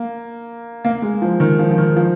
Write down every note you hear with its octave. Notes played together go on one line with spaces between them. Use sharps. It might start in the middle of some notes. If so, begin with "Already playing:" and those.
Already playing: A#3
A#3
G#3
F3
D#3
F3
F3
D#3
F3